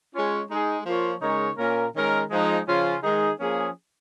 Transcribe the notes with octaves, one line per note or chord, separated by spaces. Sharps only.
G#3 C#4 F4 C#5
G#3 D#4 G#4
F3 A#3 F4 C#5
C#3 G#3 D#4 A#4 C#5
A#2 A#3 C#4 A#4
D#3 G#3 C#4 A#4
F3 G#3 D#4
C#3 F3 C#4 F4
D#3 G#3 D#4 G#4
F3 A#3 C#4 G#4